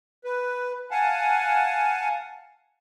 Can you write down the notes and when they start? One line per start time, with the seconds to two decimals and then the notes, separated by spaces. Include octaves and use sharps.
0.24 B4
0.91 F5 F#5 G#5 A5